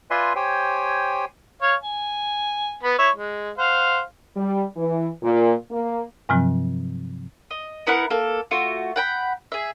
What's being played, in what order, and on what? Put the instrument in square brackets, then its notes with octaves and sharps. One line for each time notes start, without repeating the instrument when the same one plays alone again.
[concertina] F4 B4 D5 E5 G#5 C6
G4 C5 C#5 G5 G#5
[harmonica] C#5 F5
G#5
B3 B4 B5
E4 C#5 E5
G#3
C5 F5 F#5
[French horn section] G3
E3
A#2
A#3
[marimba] G2 C3 F3 F#3 C4
[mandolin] D#5
B3 E4 A#4 F#5
A#3 A4
A3 F4 F#4
F#5 G5 B5
G#4 E5